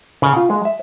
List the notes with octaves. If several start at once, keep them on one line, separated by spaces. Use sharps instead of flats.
C#3
F4
G#3
E5